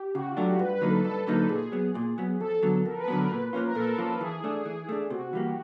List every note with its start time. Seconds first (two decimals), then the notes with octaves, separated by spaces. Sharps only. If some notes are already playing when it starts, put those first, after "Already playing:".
Already playing: G4
0.14 C#3 F#4
0.29 F4
0.37 F#3 A3 D4
0.44 G4
0.59 G2 B4
0.75 B4
0.81 D3 F#3 A#3 D#4
0.89 A4
1.04 G2 A4
1.27 D3 F#3 A#3 D#4
1.49 A#2 G#4
1.72 F#3 B3
1.95 A#2
2.18 F#3 B3
2.40 F2 A4
2.63 D3 F#3 B3
2.85 F2 A#4
2.97 B4
3.08 D3 F#3 B3 B4
3.18 A#4
3.31 A#2 B4
3.53 F3 A#3 C#4 F4
3.66 A#4
3.75 A#2 A4
3.98 F3 A#3 C#4 F4
4.20 E3 G#4
4.44 A3 D4
4.65 E3 G#4
4.89 A3 D4
5.10 C3 F#4
5.33 E3 G3 A#3 G4